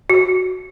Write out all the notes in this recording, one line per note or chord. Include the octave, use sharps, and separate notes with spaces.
F#4